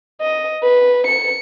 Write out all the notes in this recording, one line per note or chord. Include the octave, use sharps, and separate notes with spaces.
D#5
B4
C#7